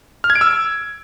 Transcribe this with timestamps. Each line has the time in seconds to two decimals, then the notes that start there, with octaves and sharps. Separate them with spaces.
0.24 F6
0.30 G#6
0.35 D7
0.41 E6